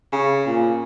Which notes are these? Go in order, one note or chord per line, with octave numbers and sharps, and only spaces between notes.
C#3
A#2